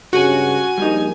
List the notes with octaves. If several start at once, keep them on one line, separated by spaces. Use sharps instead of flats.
C#2 G2 C#3 F#4 G#5
A#1 G3 D#4